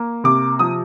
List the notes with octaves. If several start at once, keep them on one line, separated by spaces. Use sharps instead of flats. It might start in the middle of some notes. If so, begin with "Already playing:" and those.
Already playing: A#3
C3 D6
F3 D#6